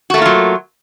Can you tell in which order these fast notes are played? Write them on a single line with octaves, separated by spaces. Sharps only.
F#4 A3 A#3 F4 F#3